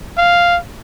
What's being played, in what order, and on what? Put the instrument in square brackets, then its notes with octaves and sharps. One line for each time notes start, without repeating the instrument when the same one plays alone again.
[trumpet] F5